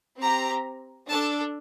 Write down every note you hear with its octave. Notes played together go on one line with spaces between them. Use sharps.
C4 G4 A#5
D4 A4 A5